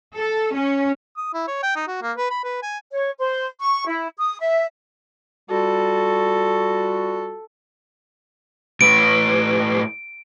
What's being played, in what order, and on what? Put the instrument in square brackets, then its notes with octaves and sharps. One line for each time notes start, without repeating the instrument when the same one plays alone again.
[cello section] A4
C#4
[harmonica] D#6
E4
C#5
G5
D#4
F#4
A#3
B4
B5
B4
G#5
[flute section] C#5
C5
C#6
E4
D#6
E5
[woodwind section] G3 F4 F#4 [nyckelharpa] A4
[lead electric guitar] A2 B4 [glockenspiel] D7